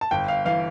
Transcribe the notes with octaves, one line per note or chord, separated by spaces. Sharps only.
A5
G1 G5
F5
E3 F5